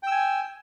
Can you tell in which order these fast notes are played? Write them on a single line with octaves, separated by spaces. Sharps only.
G5 E6 G#5